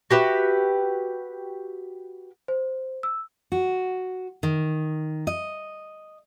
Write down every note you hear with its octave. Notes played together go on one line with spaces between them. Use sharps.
F#4 G4 B4 E5
C5
E6
F#4
D#3
D#5